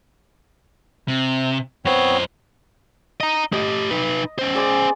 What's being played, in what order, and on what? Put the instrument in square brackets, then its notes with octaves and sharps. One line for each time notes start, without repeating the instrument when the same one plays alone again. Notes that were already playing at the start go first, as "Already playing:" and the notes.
[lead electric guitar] C3
[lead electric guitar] F#2 C5 [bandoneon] B3 C4 C#5
[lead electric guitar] D#5 A#5
[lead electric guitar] A3 G4 [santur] D#5
[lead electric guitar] D#4 B4
C#4 C5
[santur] G#4 D5 C6